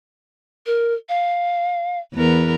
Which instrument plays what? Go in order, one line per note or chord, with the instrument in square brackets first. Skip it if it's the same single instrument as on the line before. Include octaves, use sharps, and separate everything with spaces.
[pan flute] A#4
F5
[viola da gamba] E2 B3 A#4